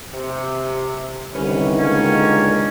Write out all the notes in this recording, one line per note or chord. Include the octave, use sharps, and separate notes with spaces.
C3
C2 D3 D#3 C#4 B4
C#2 A#3 C#4